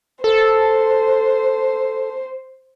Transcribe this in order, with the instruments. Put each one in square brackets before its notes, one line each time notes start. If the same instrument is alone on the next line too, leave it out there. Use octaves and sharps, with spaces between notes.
[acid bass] A4 [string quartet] C5